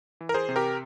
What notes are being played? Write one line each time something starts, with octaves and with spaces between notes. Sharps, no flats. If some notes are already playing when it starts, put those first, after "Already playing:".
E3
A#4
G#4 C5
C3
G4 A#4